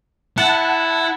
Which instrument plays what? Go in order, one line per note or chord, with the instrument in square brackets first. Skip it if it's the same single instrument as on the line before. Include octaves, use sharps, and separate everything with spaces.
[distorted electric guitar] E4 [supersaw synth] F#5 A5